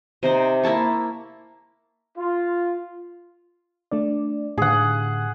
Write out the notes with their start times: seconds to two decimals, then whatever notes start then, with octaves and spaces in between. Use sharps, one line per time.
0.23 C3 D#4 C5
0.63 A#3 E4 A5 C#6
2.18 F4
3.92 A3 D4 D5
4.58 A2 D3 G#4 F#5